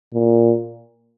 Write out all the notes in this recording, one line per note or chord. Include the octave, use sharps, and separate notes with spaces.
A#2